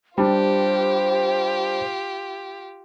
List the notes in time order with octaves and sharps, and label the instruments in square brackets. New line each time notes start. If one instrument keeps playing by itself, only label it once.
[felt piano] G3 D4 [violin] F4 G4 [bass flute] C5